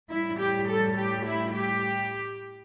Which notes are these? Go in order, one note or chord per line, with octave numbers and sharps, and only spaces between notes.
A2 G3 E4
G4
A4
G4
E4
G4